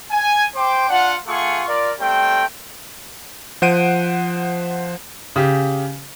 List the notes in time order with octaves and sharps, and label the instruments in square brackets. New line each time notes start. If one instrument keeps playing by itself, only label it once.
[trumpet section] G#5
C5 G5 C6 D6
D4 F4 F#5
A3 F4 G#4 F#5 C#6
F4 A#4 D5
G3 A3 C4 G5
[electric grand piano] F3 C5 F#5 D7 D#7
[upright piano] C#3 G4